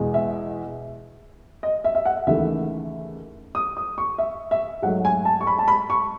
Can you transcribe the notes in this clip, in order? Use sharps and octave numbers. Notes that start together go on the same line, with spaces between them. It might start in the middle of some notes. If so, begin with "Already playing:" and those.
Already playing: E2 B2 G#3
E5
D#5
E5
E5
F#5
D#2 C#3 E3 A3 E5
D#6
D#6
C#6
E5
E5
G#2 F#3 A3 F#5
G#5
A5
C#6
B5
A5
B5
C#6